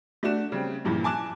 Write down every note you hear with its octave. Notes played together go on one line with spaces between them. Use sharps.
A3 D4 F#4 E7
C#3 G3 C4
G2 A#2 C#3 E3 F3
G#5 A5 D6 F#6 E7